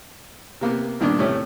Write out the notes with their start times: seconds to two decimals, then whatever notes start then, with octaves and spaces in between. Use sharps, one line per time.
0.61 C3 A#3 B3
1.00 G2 A#2 D#3 B3 D4
1.19 A2 C3 A3 C#4